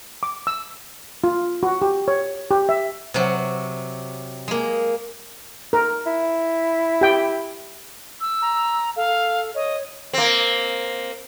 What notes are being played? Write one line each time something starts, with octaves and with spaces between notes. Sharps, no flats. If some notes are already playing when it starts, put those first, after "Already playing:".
D6
E6
F4
F#4
G4
C#5
G4
E5
C3 F#3
G#3 A#3
A#4
E4
G4 G5
E6
A#5
A4 F5
C#5 D#5
A#3 C4